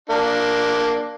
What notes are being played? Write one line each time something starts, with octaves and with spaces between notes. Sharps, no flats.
A#3 D4